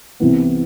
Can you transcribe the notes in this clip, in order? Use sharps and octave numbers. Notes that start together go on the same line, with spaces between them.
C2 C3 E3 B3